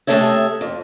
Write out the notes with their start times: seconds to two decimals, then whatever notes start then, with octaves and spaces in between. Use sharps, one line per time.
0.07 C3 A3 G#4 A4 C#5 E5
0.61 F2